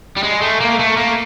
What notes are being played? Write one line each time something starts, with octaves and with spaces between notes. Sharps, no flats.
G3
G#3
A3
A#3
A3
A#3